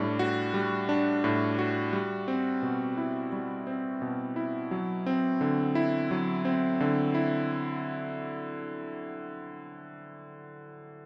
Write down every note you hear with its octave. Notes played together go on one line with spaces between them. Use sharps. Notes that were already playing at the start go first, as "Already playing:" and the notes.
Already playing: A2 G3 D4
F#4
G3
D4
A2
F#4
G3
C4
B2
E4
G3
C4
B2
E4
F#3
C4
D3
E4
F#3
C4
D3
E4